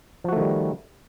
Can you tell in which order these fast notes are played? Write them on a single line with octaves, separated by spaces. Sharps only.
F3 F#4 A3 D#3 G3